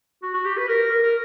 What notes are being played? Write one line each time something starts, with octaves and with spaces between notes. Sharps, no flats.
F#4
F#4
G4
B4
A#4
A#4
A#4